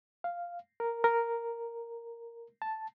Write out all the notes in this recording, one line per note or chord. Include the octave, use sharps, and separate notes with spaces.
F5
A#4
A#4
A5